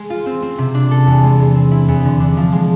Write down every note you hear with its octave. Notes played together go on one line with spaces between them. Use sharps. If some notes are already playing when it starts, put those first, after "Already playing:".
Already playing: G#3
F4
C4
C4
C3
D4
A4
E2
G#3
G#3
C4
E4
E2
D3
D4
F3
G#3